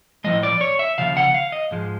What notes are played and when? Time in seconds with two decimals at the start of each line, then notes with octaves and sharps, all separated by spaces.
0.24 A2 F3 G#3 D#5
0.43 D5
0.61 C#5
0.79 E5
0.98 D#2 C#3 F3 F5
1.17 F#5
1.34 F5
1.52 D#5
1.71 G#2 F3 G#3